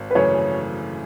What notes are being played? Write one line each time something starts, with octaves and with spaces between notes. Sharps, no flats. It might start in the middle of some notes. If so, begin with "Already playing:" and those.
Already playing: G#1
B4
F#2 C#3 E3 A3 C#5